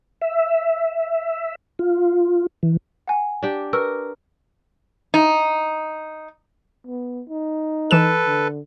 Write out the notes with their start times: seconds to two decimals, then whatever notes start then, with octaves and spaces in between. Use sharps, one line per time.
0.22 E5
1.79 F4
2.63 E3
3.08 F#5 G#5
3.43 D4 G4
3.73 A#4 B4 C#6 E6
5.14 D#4
6.86 B3
7.29 D#4
7.91 E3 A4 B4 E7
8.26 D3